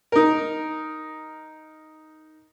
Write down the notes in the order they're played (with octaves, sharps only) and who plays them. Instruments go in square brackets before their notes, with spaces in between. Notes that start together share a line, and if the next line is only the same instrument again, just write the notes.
[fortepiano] D#4 A#4